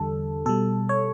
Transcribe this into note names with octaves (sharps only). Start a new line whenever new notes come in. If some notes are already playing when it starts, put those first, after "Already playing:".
Already playing: E2 D3 G3 A4
B2 G3 A4
C#5